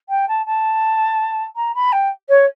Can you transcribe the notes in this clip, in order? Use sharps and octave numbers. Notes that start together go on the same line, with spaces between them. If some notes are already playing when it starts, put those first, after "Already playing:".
G5
A5
A5
A#5
B5
G5
C#5